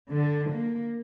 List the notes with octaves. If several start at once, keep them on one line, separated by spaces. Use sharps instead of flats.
D3
A#3